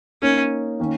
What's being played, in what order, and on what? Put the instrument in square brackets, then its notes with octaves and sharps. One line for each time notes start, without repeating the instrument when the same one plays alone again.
[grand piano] A#3 D#4 A#4 C#5 [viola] C#4
[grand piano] D#3 A#3 C#4